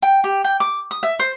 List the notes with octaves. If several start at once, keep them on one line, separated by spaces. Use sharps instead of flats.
G5
G4
G5
D6
D#6
E5
C5